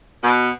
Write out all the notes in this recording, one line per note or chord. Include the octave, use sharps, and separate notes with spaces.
B2